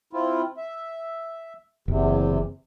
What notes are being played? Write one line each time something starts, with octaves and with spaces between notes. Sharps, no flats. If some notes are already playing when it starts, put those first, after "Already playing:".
C4 E4 F4
E5
F#1 E2 C3